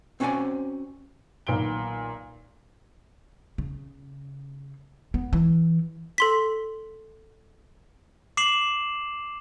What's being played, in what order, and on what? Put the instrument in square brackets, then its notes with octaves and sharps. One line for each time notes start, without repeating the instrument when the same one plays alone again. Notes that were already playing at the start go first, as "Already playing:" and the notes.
[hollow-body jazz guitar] C4 C#4 F#4 C5 D5 G#5
[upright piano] B1 A#2 D#3 B3 D7 G7
[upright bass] C#3
B3
E3
[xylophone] A4 C6 B6
[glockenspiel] D6 C7 E7 F#7